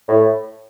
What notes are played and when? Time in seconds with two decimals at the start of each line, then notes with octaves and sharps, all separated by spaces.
0.08 A2